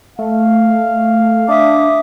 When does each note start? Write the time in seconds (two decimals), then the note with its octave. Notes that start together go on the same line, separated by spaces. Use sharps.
0.19 A3 F5
1.48 D4 E5 D6 D#6